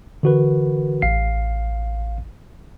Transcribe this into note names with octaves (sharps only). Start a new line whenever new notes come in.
D3 E3 F#4 A#4 B4
A1 F5 C7